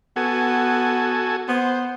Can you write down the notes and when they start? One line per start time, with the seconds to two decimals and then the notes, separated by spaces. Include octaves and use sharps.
0.16 B3 F#4 A4 G#5
1.49 B3 C5